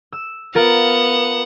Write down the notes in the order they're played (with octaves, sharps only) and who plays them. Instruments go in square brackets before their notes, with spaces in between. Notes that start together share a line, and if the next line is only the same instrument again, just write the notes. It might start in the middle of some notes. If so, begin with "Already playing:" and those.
[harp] E6
[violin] B3 F#5 [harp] F4 A#4 F5